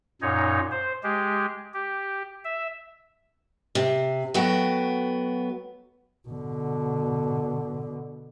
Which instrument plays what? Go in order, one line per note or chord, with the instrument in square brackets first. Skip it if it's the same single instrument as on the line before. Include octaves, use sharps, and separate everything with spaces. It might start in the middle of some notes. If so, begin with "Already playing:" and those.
[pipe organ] F#2 A#2 D#4 C#5
C5
G#3 G4
G4
E5
[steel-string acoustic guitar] C3
F#3 A3 B3 F#4 G5
[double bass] B2 D3